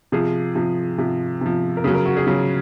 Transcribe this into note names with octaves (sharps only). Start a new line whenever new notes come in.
C3 F3 G#4
C3 F3
C3 F3
C3 F3
A#4
C#3 F#3 G#4
A#4
F#4
G#4
C#3 F#3